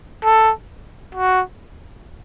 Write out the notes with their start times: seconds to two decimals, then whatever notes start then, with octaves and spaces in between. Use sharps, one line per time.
0.24 A4
1.15 F#4